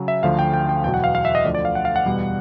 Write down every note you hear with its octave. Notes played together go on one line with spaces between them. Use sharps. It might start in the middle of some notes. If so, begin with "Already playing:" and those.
Already playing: C#3 F#3
E5
D2 D3 F3 F5
G5
G5
G5
E2 B2 F#3 G5
F#5
F5
F5
E5
D#5
D2 D3 F3 D5
D5
F5
F#5
F5
F#5
E2 B2 G3